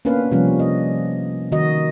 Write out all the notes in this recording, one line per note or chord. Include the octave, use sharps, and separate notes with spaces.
A#3 B3 C#4 D4 B4 F5
C3 F3 G3 C#4
D#5
D#3 F#4 D#5